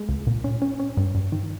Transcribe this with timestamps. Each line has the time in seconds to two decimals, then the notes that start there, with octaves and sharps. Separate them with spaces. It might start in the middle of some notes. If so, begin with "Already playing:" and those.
Already playing: G#3
0.09 C#2
0.27 A#2
0.44 C#4
0.62 C#4
0.79 C#4
0.97 G2
1.15 G2
1.32 D#3